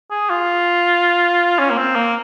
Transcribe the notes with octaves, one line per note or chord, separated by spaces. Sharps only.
G#4
F4
C#4
A#3
C4
A#3